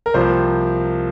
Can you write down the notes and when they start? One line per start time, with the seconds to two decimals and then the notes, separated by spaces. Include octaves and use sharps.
0.06 A#4
0.14 C2 C3 F3 A#3 C5